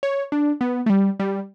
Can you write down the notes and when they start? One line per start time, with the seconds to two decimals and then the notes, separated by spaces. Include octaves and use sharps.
0.03 C#5
0.32 D4
0.61 B3
0.86 A3
0.90 G3
1.20 G3